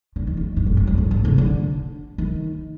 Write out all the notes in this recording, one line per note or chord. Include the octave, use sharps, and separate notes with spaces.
D3
D#3
D#3
G2
G2
G2
F2
G2
G#2
C3
D3
D#3